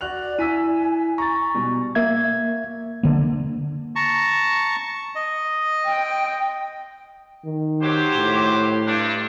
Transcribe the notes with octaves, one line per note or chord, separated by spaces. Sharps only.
F#4 D5 F#6 F7
E4 G#5 E6 B6 D#7
A#5 C#6 A6
B2 G3
A#3 E5 G#6
D3 A#3
A5 A#5 C#6
D#5
G5
D#3
F#3 G4 C5
A2
G2 D4